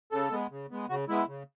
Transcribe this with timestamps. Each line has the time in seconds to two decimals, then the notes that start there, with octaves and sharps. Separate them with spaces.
0.12 C#3 A4
0.32 G#3 B3
0.51 C#3
0.71 G#3 B3
0.89 C#3 F#4
1.08 G#3 B3 E4
1.28 C#3